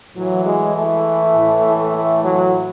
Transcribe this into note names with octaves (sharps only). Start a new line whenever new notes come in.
A2 E3 F#3
G#3
A3
A2 E3
A3
F#3